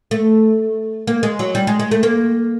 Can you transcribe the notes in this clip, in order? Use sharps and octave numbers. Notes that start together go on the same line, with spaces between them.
A3
A#3
G#3
F#3
G3
G#3
G#3
A3
A#3